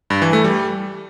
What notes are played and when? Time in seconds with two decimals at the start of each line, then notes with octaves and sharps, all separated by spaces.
0.10 G2
0.22 E3
0.33 A3
0.44 G3